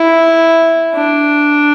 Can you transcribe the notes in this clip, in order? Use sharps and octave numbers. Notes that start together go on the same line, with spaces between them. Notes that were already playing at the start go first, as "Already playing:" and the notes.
Already playing: E4
D4